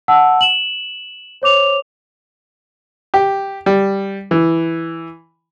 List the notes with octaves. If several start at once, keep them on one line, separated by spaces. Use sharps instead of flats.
F#5 A5 E6
E7 F#7
C5 C#5 D6 F7
G4
G3
E3